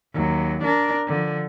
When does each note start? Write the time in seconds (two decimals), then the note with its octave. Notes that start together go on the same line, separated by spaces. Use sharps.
0.14 D#2 F#3
0.64 D4 A#4
1.08 D3 F3